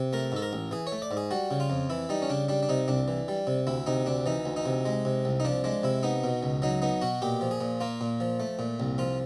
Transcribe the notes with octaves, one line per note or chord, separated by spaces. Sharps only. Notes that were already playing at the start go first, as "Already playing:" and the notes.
Already playing: C3
A3 A#4
G#2 A4
A#4
A1
E3 G#4
C#5
A3
D5
G#2
G#4
G3 F#4
C#3
F4
F2
E3 E4
G3 D#4
C#4
C#3 D4
G3 D4
D4
C3 D#4
C2 D4
E3
G3
C3
D2 E4
C3 D#4
D2 D4
E3 D#4
D2
D#4
C3
G#3
C3
C2
D#4
F3 D4
G#3 D4
C3 E4
B3 D#4
B2
C#2
F#3 D#4
B3 D#4
B2 F#4
A#2 G4
F3
G#4
A#2
A#3 F4
A#2
F3
A3
A#2
C2
F3 F4